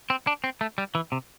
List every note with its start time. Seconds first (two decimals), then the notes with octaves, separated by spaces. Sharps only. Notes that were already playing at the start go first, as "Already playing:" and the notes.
0.10 C4
0.27 D4
0.44 C4
0.61 A3
0.78 G3
0.95 E3
1.12 C3